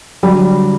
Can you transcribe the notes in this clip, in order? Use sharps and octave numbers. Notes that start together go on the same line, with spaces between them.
D3 F#3 G3